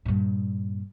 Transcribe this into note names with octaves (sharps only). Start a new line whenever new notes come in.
G2 A#2